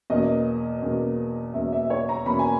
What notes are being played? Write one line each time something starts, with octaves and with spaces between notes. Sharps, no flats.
E2 B2 A#3 C#4 D#5
E2 B2 A#3 C#4
E2 B2 A#3 C#4 E5
E5
C#5
A#5
E2 B2 A#3 C#4 B5
G#5